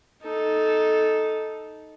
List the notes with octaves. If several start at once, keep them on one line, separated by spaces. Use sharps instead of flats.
D#4 A4